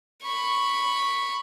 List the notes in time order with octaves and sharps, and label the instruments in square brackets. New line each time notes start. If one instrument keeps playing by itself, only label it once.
[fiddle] B5 C#6